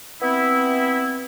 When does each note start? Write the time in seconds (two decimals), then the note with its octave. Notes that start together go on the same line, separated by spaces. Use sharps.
0.21 B3 C4 E4